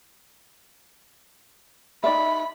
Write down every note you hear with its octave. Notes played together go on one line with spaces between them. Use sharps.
D#4 D5 E5 B5